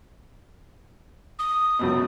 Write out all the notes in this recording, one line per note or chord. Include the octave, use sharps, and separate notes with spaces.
D#6
C#2 F#2 B2